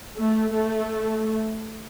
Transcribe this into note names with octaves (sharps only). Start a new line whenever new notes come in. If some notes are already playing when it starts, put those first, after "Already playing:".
A3
A3